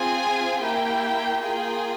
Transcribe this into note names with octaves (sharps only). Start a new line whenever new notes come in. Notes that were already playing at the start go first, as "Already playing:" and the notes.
Already playing: C4 F4 G#4 G#5
A#3 E4 G4 G5
A#3 F4 G#4 G5